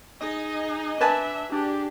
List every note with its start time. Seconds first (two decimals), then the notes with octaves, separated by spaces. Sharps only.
0.21 D#4 G#4 D#5
1.01 D4 B4 E5 G#5 A5
1.52 D4 G4 G#4